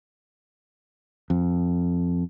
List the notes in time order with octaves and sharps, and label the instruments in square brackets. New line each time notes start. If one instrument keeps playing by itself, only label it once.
[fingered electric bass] F2